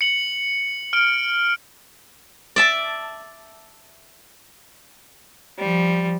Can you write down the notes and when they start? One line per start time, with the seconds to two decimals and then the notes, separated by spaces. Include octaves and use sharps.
0.01 C#7 F#7
0.93 F6 D7
2.56 D5 E5 A5
5.59 F3 G3